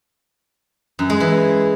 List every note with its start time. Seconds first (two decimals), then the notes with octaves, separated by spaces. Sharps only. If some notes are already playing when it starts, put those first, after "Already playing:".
0.99 F#2
1.10 G#3
1.20 E3